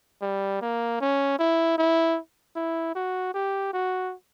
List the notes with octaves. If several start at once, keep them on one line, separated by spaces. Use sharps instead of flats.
G3
A#3
C#4
E4
E4
E4
F#4
G4
F#4